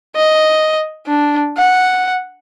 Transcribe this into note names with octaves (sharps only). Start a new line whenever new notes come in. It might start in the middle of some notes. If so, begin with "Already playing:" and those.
D#5
D4
F#5